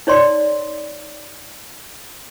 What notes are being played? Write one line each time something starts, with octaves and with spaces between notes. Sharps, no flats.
D#4 C#5 D5 C6